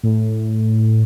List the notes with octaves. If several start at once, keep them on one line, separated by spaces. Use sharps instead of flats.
A2